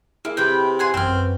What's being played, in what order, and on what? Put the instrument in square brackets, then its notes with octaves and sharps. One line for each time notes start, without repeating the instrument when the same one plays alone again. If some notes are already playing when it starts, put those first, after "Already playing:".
[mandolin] A#3 [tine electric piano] E4 G#4 E5
[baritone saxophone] C3 [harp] C4 B6 [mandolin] B4 G5
[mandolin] F#5 G#5 C6
[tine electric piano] A1 [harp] F#2 [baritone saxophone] C4 [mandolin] E6 F6
[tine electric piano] B4